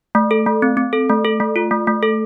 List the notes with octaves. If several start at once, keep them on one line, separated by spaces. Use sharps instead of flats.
A3
A4
A3
C4
C4
A4
A3
A4
A3
F4
A3
A3
A4